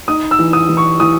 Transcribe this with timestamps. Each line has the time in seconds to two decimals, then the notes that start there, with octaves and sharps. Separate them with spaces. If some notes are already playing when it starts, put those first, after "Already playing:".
0.08 D#4 D#6
0.31 E6
0.39 E3
0.53 D#6
0.69 E3
0.77 C#6
1.00 E3 D#6